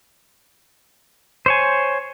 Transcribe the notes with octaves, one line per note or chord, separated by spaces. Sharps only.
C5 C#5 G#5